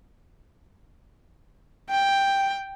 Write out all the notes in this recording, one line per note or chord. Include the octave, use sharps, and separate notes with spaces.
G5